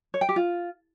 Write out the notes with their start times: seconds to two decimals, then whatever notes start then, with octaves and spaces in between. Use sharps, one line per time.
0.14 C#5
0.21 G5
0.29 G4
0.36 F4